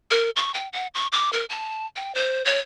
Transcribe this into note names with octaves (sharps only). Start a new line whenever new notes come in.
A#4
C#6
G5
F#5
C#6
D6
A#4
A5
G5
C5
C#5